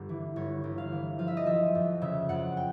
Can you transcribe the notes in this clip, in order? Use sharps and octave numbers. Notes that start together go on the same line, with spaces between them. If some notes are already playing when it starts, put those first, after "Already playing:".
Already playing: G1 G4
E3
G1 C#5
G1
F5
E3
F3 F5
E5
D#5
F3 E5
F2
C#3 E5
F2 F#5
G5